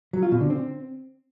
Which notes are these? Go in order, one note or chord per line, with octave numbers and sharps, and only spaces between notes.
F#3
F4
B2
D3
C4